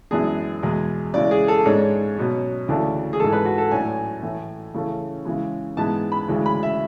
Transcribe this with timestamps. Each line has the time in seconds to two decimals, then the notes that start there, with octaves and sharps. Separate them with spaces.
0.11 F#2 E3 G#3 B3 D4 G#4
0.63 E2 B2 G#3
1.14 C#3 E3 G#3 D5
1.31 G#4
1.48 A4
1.66 G#2 G#3 D4 C#5
2.17 B2 F#3 C#4
2.68 D2 C#3 E3 A3 D4
3.13 G#4
3.20 G#2 E3 G#3 A4
3.33 B4
3.45 F#4
3.58 A4
3.71 A2 F#3 A3 D4 G#5
4.23 A2 E3 A3
4.74 C#3 E3 A3 C#4
5.25 C#3 E3 G#3
5.77 G#2 E3 G#3 B3 A5
6.12 B5
6.28 D2 C#3 E3 G#3
6.46 B5
6.63 E5